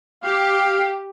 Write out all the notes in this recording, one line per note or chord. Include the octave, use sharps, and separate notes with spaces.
G4 F5